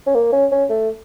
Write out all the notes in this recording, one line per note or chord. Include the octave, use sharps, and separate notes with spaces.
C#4
A#3
C#4
C#4
A3